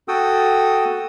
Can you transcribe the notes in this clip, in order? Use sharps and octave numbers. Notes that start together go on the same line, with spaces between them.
F#4 A4 G5 D#6 E6